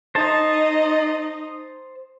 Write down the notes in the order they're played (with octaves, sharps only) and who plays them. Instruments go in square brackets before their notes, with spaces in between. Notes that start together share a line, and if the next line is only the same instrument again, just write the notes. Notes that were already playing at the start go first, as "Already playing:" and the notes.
[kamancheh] D#4 D#5 [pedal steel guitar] C5 A5